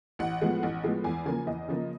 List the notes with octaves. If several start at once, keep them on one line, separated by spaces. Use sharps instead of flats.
A1 F#5
A2 F3 G#3 B3
A1
A2 F3 G#3 B3
E2 G#5
C#3 F3 A#3 G#5
E2 D#5
C#3 F3 A#3